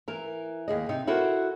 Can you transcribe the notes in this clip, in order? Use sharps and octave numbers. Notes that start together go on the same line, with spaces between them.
E3 A#4
D#2 G#4 D#5
C3 D#4
E4 F#4 A4 A#4 C5